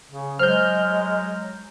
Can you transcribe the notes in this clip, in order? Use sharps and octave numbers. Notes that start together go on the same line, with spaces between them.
C#3
F#3 G#3 C5 F6 G6